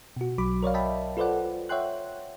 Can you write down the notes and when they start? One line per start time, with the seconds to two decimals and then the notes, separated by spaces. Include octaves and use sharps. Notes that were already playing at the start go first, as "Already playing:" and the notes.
0.17 B2 F#4
0.38 B1 F#3 B5 D6
0.63 A#4 C#5 D5 F5
0.74 D#5 E5 G5 A5 B5
1.17 F4 A4 B4 C5 D5 F#5
1.69 C#5 E5 F#5 G5 C6 F#6